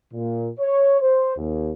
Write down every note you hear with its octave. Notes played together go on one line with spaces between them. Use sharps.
A#2
C#5
C5
D#2